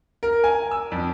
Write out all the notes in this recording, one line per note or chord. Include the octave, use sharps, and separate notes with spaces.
A#4
G#5
E6
F2